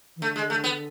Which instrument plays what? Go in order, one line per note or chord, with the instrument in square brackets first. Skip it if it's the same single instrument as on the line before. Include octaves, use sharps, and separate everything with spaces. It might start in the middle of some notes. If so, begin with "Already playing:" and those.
[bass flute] E3
[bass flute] D3 [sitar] A3
[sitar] G#3
A3
B3